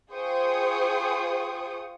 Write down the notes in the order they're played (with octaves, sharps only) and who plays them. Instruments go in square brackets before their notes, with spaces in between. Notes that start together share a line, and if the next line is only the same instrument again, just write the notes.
[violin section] F4 G#4 C5 G5 C#6 D#6